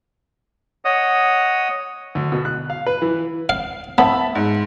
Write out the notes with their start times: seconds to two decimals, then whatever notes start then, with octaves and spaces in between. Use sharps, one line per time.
0.85 C#5 D#5 F#5 D#6
2.15 D2
2.32 B2
2.45 F#6
2.70 F5
2.86 B4
3.02 E3
3.49 F5
3.98 B3 E5 A5 B5
4.35 G#2